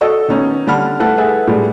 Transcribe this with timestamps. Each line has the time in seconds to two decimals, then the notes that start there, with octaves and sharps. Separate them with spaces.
0.01 F#4 A4 D#5 E6
0.28 D#3 B3 C#4 D#4
0.67 D3 G3 F#5 A5 B5 F6
0.99 A3 E4 A4 B4 F#5 A5
1.17 G#4 A4 B4 E5 F#5 G#5
1.47 A2 G3 G#3